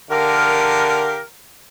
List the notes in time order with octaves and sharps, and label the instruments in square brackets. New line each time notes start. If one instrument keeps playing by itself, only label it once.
[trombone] D3 [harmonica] G4 F5 [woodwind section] A#4